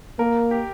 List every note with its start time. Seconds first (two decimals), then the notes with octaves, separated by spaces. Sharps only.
0.19 A#3 A#4
0.51 G4